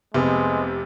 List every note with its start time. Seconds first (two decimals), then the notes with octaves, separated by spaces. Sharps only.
0.14 F1 C3 G#3 B3 C4